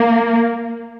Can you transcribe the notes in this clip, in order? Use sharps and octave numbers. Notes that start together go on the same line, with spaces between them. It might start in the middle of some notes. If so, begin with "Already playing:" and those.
Already playing: A#3